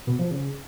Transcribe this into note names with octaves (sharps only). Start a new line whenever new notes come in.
B2
F3
C#3